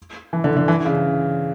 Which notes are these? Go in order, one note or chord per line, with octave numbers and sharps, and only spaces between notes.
E3
D3
D3
E3
C#3